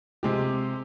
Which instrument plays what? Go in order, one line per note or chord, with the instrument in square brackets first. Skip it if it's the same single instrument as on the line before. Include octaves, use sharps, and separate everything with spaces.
[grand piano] C3 G#3 G4